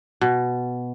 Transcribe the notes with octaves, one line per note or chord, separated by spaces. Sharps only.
B2